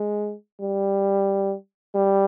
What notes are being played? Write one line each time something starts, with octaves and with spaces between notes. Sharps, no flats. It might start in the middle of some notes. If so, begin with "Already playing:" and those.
Already playing: G#3
G3
G3